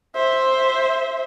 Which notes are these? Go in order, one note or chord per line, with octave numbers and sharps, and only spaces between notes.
C5 E5